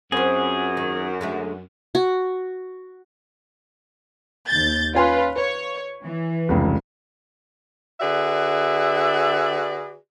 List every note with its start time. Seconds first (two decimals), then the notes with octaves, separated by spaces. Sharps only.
0.12 F#2 C4 F4 G#4
0.77 D#3
1.21 D3 G#3 A3
1.95 F#4
4.48 D#2 G6 A6
4.95 C#4 F4 B4 G#5 C6
5.36 B4 C#5
6.05 E3
6.49 F1 C#2
8.01 D3 F#4 G#4 B4 D5 E5